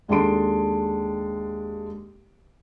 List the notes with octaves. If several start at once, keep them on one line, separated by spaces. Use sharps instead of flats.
D#2 G#3 D4 A4 C6 D7